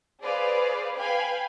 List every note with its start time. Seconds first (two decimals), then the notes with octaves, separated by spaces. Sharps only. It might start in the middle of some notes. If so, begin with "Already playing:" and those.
0.23 G#4 B4 C5 D5 F5
0.96 B4 F5 G5 G#5 B5